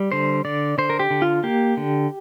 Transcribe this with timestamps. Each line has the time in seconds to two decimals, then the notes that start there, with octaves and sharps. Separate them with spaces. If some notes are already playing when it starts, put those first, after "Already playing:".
Already playing: G3
0.12 D3 C5
0.45 D3 D5
0.78 D3 C5
0.90 A#4
0.99 G4
1.10 D3
1.22 F4
1.44 A#3 G4
1.77 D3